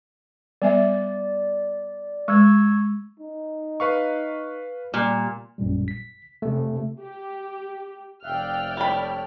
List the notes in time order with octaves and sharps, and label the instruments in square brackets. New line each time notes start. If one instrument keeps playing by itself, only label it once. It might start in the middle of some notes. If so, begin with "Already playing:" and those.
[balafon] G3 B3 E5 [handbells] D5
[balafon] G#3 [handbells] C#6 E6 G#6
[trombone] D#4
[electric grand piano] B4 F5 C#6
[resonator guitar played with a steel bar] A#2 [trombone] G3
[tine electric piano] A1 F#2 A#2 G3
B6
C3 A3
[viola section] G4
[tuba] F1 [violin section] D5 G5 F6 [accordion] E5 F5 F#6
[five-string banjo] G3 B5 [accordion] A4 C#5